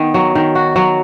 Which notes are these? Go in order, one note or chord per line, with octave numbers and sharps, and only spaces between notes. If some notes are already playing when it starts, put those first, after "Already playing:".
Already playing: D#3 B3
F#3
D#3
F#4
F#3